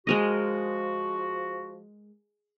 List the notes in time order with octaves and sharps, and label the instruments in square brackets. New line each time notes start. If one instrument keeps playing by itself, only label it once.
[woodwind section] F3 F#4 [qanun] G#3 A#4 D#5